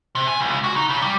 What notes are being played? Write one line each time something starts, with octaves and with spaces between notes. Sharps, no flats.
C3
G#5
C#2
F#4
D#4
C#3
G3